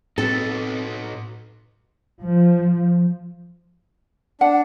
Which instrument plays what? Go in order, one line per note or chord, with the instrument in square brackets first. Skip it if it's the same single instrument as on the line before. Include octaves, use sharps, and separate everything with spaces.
[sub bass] A2 [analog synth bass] C4 [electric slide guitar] D#4 F#4 B4 [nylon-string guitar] A4
[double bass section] F3
[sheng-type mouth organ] D4 [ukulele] F#5